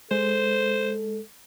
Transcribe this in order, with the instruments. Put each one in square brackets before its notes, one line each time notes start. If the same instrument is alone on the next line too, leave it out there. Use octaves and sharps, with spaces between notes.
[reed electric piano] G#3 [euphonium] A4 [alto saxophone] C5